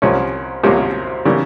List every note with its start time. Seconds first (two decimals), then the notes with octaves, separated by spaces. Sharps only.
0.02 C2 C3 F3 A#3 C#4
0.63 C2 C3 F3 A#3 C#4
1.25 C#3 E3 G3 A#3